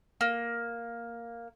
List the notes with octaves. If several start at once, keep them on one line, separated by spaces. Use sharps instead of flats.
A#3